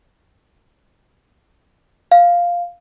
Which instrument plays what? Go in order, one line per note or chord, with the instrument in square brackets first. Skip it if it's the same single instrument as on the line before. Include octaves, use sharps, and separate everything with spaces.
[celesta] F5